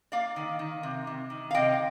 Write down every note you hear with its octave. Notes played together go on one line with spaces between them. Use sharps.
A#3 D5 F5
D#3
D#3
C3
C3
D#3
F5
C3 D#5 G5